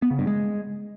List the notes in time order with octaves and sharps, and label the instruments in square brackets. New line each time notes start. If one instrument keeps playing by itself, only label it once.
[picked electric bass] B3
C#3
G2
G#3